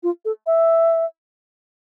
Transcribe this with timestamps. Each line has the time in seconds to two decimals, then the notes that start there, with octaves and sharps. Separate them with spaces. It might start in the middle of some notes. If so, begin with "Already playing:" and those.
0.03 F4
0.25 A4
0.46 E5